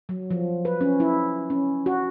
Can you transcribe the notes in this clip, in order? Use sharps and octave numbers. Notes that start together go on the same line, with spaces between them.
F#3
F3
B4
C#4
E4
C#4
F#4